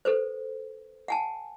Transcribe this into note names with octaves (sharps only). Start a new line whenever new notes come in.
A4 B4 C5
F#5 G#5 A5